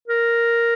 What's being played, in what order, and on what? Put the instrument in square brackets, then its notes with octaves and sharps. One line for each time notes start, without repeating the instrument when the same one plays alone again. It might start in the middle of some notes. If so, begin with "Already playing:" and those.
[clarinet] A#4